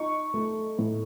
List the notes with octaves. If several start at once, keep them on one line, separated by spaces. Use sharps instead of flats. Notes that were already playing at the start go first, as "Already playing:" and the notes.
Already playing: D#4 C#6
A3
A2